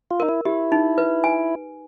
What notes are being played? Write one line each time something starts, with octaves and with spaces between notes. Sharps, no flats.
F4
D#4 A#4
E4
E4 G4
D#4
B4
G#5